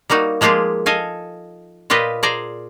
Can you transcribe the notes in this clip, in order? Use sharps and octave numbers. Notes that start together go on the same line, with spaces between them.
G3 A#3 D#4 F#4
F3 G#3 A#3 F4 G4 G#4
A4 D#5 F5 G#5
A#2 F4 G4 B4 D#5
G#4 C5 D5 A#5